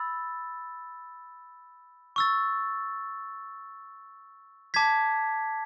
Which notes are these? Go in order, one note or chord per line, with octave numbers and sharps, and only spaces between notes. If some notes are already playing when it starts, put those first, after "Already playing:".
Already playing: B5 E6 A6
C#6 E6 A6
A5 D6 G#6 B6